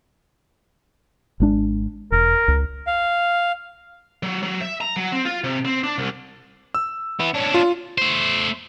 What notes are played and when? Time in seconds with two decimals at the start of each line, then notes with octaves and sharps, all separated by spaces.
1.40 G#1 G#3 D4
2.12 E1 A#4
2.48 C#2
2.87 F5
4.23 F#3
4.43 F#3
4.61 E5
4.81 A#5
4.96 F#3
5.12 C4
5.25 F4
5.44 C3
5.65 C4
5.83 D4
5.98 C2
6.75 E6
7.20 B3 E4
7.35 C#4 D4
7.54 F4
7.98 A3 C5